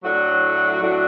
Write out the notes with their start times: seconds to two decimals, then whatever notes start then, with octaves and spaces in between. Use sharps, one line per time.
0.02 A2 F#3 A3 D4 F#4
0.80 A2 F#3 A3 D4 F#4